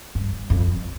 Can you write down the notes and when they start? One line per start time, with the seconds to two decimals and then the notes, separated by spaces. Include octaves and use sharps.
0.15 G2
0.50 F2